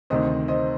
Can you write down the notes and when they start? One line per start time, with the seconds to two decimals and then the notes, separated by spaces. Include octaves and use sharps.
0.10 D2 C3 D#3 C5 D#5
0.48 C5 D#5